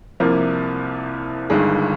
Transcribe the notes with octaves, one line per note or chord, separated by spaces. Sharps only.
C2 C3 F3 A#3
G1 G2 D#3 G#3